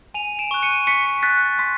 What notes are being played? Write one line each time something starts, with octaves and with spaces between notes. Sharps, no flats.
G#5 D#7 F7
D7 E7
C#6 F#6
C#7 D#7
C#6 B6 C#7
F#6 A6 B6
C6 A6 B6